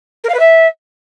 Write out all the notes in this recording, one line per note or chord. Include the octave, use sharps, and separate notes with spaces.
A#4
F5
B4
E5